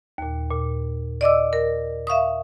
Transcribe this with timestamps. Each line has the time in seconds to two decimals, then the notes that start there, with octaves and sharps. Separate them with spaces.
0.18 D#2 A#2
0.51 A#2
1.21 D5 D#5 D6 E6
1.53 A#4
2.07 E5 F5 C#6 D#6